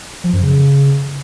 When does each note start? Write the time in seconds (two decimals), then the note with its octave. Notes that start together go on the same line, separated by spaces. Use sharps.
0.24 F3
0.33 F#2
0.42 C#3